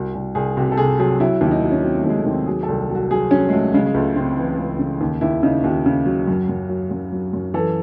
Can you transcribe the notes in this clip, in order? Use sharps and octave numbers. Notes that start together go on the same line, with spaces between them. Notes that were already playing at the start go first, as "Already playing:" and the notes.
Already playing: C2 F#4
C2 F#4
C2 G#4
C3 F#4
A4
C3 G#4
F#3 G#4
F#3 E4
D#2
E4
D#4
F#3
C#4
F#3 C4
A3
D#2 G#3
A3
D#2 C4
F#3 G#4
A4
C2
F#3
F#4
F#3 G#4
F#3 C#4
G#3
F#3 A3
C#3 G#3
G#3
C#2 A3
C#3 C4
E3
C#2
C#3
D#2
D#2 E4
C#3 D#4
D#2 F#4
C#3
F#3
F#2
F#2
F#3
F#2
F#3
F#2
E3 A4